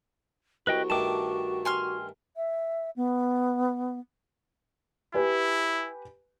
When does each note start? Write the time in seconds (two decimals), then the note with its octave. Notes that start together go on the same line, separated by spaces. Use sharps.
0.67 C2 F#4 B4 D#5 G5
0.90 G2 D#3 A3 A5 D6
1.65 G#5 C6 F6
2.36 E5
2.96 B3
5.14 E4 G4 B4 G#5